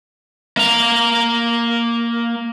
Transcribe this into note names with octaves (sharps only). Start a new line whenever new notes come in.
A#3 A#5